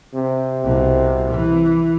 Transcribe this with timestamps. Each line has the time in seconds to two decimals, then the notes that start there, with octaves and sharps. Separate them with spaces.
0.15 C3
0.63 C2 B2
1.31 E3